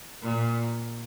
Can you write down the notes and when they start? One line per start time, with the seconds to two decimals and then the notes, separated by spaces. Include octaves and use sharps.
0.22 A#2